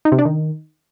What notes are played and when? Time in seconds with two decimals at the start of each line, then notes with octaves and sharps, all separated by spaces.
0.05 D#4
0.12 C3
0.19 D4
0.25 D#3